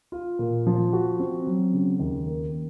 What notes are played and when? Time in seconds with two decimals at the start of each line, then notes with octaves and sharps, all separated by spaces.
0.12 F4
0.39 A#2
0.67 F3
0.93 F#4
1.19 C4
1.47 F#3
1.73 C#3
2.00 D#2
2.27 A#3
2.53 A#3